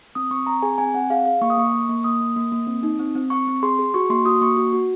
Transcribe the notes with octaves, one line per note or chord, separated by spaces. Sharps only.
C4 D#6
C4 C#6
C4 A#5
G#4 G#5
C4 G#5
C4 F#5
G#4 F5
G#4 F5
A#3 C#6
D#6
A#3 C#6
A#3
A#3
A#3 D#6
A#3
A#3
A#3
C4
D#4
C4
C4
C4 C#6
C4
G#4 C6
G#4
F#4 C#6
A#3 C6
F#4 D#6
A#3 C#6
F#4
F#4